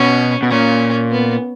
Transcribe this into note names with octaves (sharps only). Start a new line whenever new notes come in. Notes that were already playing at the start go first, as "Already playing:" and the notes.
Already playing: B2 C#4
B2
A#2 C#4
B3